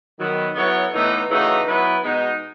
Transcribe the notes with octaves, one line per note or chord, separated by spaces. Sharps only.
D#3 F#3 B3
F#3 B3 E4 A4 C#5
A2 E3 B3 D#4
C#3 E3 A3 D#4 F#4
F#3 B3 E4 B4
B2 G#3 B3 D#4